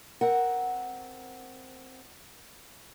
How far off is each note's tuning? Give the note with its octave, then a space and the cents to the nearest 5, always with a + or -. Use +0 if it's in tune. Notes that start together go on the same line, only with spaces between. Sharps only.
C4 +0 A#4 +10 F#5 +0